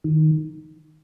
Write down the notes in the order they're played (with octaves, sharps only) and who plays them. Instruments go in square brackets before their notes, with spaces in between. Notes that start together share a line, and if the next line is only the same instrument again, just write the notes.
[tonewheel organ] D#3